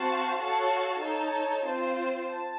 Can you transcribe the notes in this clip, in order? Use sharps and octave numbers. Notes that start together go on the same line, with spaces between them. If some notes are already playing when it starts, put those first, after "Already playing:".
Already playing: C4 F#4 C5 F5 A5
F#4 A4 C#5 F5 A5
D#4 A4 C#5 A5
C4 F4 C5
A5